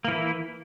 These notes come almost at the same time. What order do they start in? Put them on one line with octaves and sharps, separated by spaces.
A#3 E3 E4